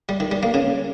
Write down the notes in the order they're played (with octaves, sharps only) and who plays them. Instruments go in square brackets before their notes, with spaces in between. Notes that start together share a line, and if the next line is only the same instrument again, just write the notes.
[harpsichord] G3
D#3
G3
A#3
C#3